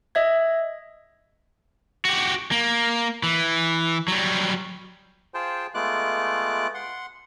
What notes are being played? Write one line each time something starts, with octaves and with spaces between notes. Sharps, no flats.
D#5 E5 G#6
F#4 G4
A#3
E3
F#3 G3
F4 G#4 C5 G5 A5
G#3 A3 B3 F4 D6 F#6
F#5 C6